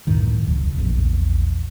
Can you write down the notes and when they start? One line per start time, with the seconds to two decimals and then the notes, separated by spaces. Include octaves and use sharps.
0.07 C#2 F#2 A2 D#3
0.46 E1 C#2 F#2
0.78 A#1 E2